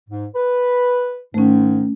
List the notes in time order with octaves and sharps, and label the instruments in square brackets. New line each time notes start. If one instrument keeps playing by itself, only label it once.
[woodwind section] G#2
B4
[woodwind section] G#2 D#3 [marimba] A3 C#4